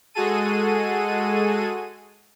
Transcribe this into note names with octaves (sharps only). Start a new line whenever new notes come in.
G#3 F#4 G#4 A4 D#7